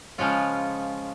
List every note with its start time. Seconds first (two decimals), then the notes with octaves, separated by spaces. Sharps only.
0.18 C#3 F3 G#3 C#4 F4